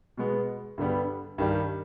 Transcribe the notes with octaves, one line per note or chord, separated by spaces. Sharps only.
B2 G#3 B3
G2 D3 G3 B3
G2 D#3 G3